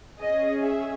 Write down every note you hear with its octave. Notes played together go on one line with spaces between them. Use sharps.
C#4 G#4 D#5
E5